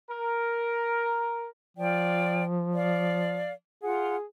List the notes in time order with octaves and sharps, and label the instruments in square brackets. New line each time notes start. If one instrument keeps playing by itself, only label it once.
[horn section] A#4
[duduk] F3 [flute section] F4 D5 G5
[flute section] D5 F5
[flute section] F4 F#5 [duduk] G#4